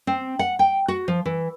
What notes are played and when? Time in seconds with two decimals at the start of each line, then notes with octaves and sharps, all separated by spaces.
0.07 C4
0.39 F#5
0.59 G5
0.88 F#4
1.08 F3
1.25 E3